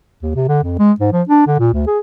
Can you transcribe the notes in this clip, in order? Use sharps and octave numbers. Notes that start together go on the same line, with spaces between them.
D#2
C3
D3
F2
G#3
G#2
F3
D4
D3
A#2
D2
G#4